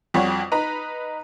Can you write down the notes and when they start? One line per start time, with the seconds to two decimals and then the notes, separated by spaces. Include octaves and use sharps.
0.14 F2 G3 F#4 C#5
0.52 D#4 B4 A#5